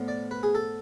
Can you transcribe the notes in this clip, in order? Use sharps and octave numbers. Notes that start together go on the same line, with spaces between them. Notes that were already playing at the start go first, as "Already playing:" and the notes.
Already playing: A2 F3 B3 D4
D5
B4
G#4
A4